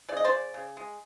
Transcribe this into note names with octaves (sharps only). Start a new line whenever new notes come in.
C#3 D5
D#5
C5 D5
C#3
C#3
G#3